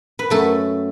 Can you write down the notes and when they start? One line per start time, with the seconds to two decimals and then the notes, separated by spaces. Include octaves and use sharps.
0.19 B4
0.30 F#2 F#3 A3 A4